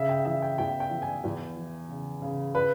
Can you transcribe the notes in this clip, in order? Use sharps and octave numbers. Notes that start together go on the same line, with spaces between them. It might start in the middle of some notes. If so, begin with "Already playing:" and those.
Already playing: C#3 E5
G5
E3 E5
G5
E2 G5
G5
E3
G#5
E2
E3
C#3
C#3
B4